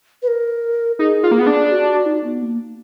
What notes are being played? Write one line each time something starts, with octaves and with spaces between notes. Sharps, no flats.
B4
A#4
D#4 G#4
F4
A#3
B3
D4
F#4
F#4
D#4
B3
A#3